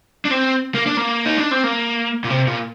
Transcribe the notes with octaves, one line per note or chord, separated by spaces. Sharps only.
D4
C4
A#3
D4
A#3
D#4
D4
C4
A#3
A#2
C3
A#2